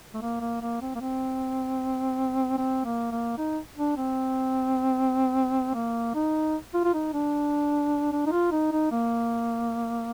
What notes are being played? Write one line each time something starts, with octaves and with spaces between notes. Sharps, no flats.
A3
A#3
A#3
A#3
C4
A#3
C4
C4
A#3
A#3
D#4
D4
C4
A#3
D#4
F4
F4
D#4
D4
D4
D#4
F4
D#4
D#4
A#3